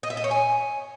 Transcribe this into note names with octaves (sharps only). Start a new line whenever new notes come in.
D#5
E5
D#5
C#5
G#5